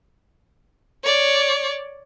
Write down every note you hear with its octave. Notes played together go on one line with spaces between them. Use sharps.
C#5 D5